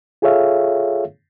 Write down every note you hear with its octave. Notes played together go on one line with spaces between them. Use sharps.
F4 G#4 A4 C#5 E5 F5